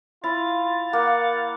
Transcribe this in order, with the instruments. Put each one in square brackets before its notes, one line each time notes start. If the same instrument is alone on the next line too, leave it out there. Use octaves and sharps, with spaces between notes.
[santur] E4 [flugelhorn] F4 [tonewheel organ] F5 A6
[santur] A#3 [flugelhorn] F#5